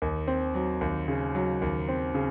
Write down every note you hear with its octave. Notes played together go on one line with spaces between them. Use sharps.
D#2
C4
F#3
D#2
C#3
F#3
D#2
C4
C#3